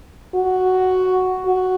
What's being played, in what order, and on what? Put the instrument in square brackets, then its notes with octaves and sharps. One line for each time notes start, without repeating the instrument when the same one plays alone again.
[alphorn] F#4
F#4